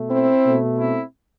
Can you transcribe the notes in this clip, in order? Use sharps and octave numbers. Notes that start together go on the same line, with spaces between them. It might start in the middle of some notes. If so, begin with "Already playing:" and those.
Already playing: B2 A3
C4 E4
B2 A3
C4 E4